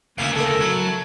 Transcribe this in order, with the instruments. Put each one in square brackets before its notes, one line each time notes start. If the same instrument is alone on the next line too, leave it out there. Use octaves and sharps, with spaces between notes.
[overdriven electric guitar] D2 C#3 [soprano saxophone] A#3 [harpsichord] E4 E5 F5
[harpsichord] E4 A#4 [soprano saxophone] A4
[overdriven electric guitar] F#3 [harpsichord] E4